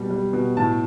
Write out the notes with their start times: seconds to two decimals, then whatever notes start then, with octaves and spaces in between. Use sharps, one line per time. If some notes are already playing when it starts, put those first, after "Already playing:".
Already playing: B2 G3
0.10 G3
0.33 B2
0.57 A2 A5